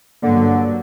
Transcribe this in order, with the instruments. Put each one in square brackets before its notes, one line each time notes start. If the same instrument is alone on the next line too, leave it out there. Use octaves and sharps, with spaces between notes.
[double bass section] G2 F#3 [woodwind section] D3 [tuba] A#3